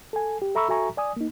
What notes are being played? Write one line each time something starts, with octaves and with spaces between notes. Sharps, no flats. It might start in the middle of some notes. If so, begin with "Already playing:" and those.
A4 G#5
G4
A4 E5 A#5 B5 C#6 E6
F#4 A4 E5 G#5 A#5 C#6
D5 G#5 D#6
A#3 D#4